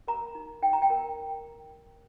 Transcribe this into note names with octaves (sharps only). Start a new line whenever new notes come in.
A#4 A#5
D#4
D#4 G5
A#5
G5
A#4